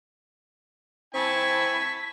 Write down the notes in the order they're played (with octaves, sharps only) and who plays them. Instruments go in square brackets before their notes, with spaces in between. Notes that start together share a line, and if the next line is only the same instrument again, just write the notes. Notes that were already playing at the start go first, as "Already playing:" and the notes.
[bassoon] C4 [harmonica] E4 G#5 [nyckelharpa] A5 C#6 [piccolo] B6